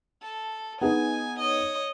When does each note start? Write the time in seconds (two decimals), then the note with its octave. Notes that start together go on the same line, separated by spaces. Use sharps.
0.22 A4
0.81 B3 D#4 G#4 G#5
1.39 C#5 D#5